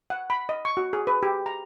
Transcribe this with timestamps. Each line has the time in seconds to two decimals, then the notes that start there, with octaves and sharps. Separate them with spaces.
0.10 F#5
0.30 B5
0.49 D#5
0.65 C#6
0.77 F#4
0.93 G#4
1.07 B4
1.23 G4
1.46 A#5